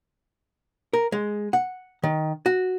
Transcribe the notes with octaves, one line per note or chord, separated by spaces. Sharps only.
A#4
G#3
F#5
D#3
F#4